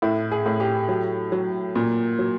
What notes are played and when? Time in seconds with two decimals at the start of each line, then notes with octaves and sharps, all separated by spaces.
0.02 A2 E4
0.31 G#4
0.46 A2
0.60 G4
0.88 F#3
1.32 F#3
1.75 A#2
2.19 F#3